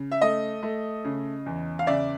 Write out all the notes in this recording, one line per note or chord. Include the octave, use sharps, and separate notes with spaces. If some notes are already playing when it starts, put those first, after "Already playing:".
Already playing: C#3
E5
A3 D#5
A3
C#3
E2
F5
C#3 D5 E5